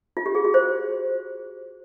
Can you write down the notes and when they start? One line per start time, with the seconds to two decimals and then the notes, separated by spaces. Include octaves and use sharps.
0.17 F4
0.26 G4
0.35 G#4
0.45 F#4
0.54 C5